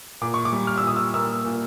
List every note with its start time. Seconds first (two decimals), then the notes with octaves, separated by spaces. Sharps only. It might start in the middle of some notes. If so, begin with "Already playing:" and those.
0.21 A#2 D6
0.34 C#6
0.45 D6
0.53 G3
0.67 F6
0.78 E6
0.83 A#2 D#6
0.97 E6
1.14 A#3 E6
1.45 A#2